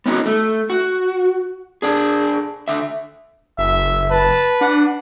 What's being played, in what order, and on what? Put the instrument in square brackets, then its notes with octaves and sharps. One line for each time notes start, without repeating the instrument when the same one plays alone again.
[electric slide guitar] B3 C#4 D#4 F#4
A3
F#4
D4 G#4
D3 E5
[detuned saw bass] F#1 [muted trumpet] E5
[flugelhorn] B4 [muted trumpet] A5
[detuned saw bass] D4 [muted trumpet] F#5